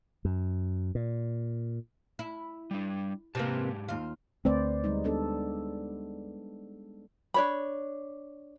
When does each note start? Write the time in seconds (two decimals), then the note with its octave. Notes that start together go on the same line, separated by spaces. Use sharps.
0.25 F#2
0.95 A#2
2.19 E4
2.71 G3 D4
3.35 G#2 C3 E3 A#3 G4 A5
3.88 D#2 F4
4.45 D2 A3 C4 B4 C5 D5
4.84 G3 G#3 D#4
5.04 B3 D4 A4
7.34 D4 C#5 B5